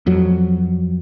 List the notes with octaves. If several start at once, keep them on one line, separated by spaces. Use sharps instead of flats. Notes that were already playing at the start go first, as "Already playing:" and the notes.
F2 F#3